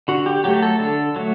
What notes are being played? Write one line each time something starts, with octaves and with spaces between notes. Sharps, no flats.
D3 F#4
G4
F#3 A3 G4
A4
D3 A4
F#3 A3